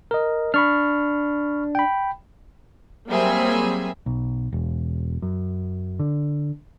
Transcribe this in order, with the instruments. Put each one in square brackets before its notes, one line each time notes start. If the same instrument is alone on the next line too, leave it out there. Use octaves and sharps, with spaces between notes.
[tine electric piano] A#4 D#5
[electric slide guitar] D4 [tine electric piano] B5 C#6 F6
[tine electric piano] G5 B5
[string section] F#3 G3 A#3 C4 G#4 E5
[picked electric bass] B1
E1
F#2
D3